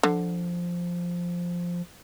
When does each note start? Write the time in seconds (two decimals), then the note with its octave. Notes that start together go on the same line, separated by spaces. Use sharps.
0.03 D3 F3